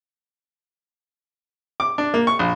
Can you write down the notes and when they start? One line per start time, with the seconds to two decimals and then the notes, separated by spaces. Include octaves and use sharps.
1.80 D6
1.98 D4
2.14 A#3
2.27 C#6
2.39 A#1